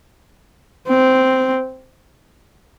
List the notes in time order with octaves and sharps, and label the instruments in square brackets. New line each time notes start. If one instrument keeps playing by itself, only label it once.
[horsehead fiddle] C4